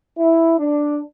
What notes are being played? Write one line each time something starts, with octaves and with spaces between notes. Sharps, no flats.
E4
D4